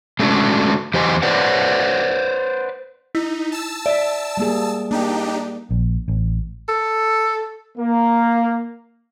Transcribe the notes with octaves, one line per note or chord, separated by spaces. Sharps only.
G#3 A3 C#4 D4 F#4
E2 G4 C5 D#5 G#5
B4 C5 D5 F#5
D#4 E4
A5 E6
D5 E5
G3 A#3 G#4
A#3 D4 D#4 G4
A#1
A1
A4
A#3